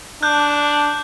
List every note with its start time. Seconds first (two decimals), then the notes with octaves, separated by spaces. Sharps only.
0.23 D4 F#6 G6